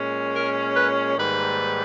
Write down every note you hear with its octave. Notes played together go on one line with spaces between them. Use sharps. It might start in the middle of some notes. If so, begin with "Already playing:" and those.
Already playing: A#2 G#3 C#4
A#4
B4
G#2 D#3 G3 A#3 B4